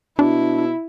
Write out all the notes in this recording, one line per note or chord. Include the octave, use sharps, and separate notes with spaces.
B2 D4 E4